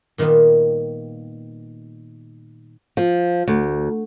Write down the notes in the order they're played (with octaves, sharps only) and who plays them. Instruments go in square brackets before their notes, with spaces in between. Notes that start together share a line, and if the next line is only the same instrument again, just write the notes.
[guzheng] A#2 D#3 G3 B3 F4
[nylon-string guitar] F3
D2